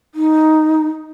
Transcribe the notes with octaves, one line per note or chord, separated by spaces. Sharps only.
D#4